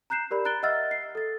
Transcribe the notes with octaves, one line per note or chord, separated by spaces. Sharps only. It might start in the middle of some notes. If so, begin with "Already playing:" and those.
A#5 F#6 G6 C7 E7
G4 A#4 D5 B5
A#5 F#6 A6 D7 G7
D#5 E5 F#5 E6 F6 A6
C7
A4 A6